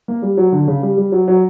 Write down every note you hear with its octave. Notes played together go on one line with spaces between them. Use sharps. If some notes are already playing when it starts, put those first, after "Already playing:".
A#3
G3
F#3
D3
C#3
G3
G3
F#3
F#3